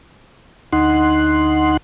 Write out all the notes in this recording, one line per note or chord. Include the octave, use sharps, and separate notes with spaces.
D2 D#4 F#5 C6